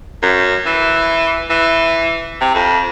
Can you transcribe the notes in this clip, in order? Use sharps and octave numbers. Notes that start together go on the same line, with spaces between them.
F#2
E3
E3
C3
F2